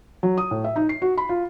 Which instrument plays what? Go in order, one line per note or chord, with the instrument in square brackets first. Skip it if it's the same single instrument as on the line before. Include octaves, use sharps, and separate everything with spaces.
[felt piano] F#3
D#6
A2
E5
D#4
C7
F#4
B5
F4